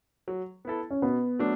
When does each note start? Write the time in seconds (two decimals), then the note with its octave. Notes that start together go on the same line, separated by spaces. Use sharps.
0.28 F#3
0.65 B3 E4 A4
0.91 C#4
1.02 B2 B3
1.39 F#3 A3 D4